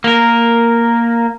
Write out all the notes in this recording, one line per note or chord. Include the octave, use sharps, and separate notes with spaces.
A#3 A#4